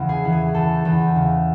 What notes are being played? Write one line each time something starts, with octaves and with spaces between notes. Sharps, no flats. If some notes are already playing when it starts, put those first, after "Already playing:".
Already playing: E2 C#3
G#4
E3
G#4
E2 A4
E2
C#3